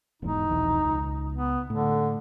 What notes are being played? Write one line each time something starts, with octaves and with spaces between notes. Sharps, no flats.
E1 E2 G#2 D#4
F1 B1 E2
C#2
B3
A2 D3